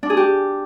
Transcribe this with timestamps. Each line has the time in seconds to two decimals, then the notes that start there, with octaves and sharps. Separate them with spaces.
0.03 D4
0.10 G#4
0.17 G4